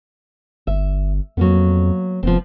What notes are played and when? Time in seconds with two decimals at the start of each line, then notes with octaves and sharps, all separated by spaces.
0.67 G1 E5
1.37 F2 F#3 A#3 B3
2.23 F1 F3 B3 C4